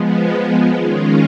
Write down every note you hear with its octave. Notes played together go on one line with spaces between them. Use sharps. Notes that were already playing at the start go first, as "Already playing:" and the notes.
Already playing: F3 G#3 B3
D#3 G#3 C#4 F4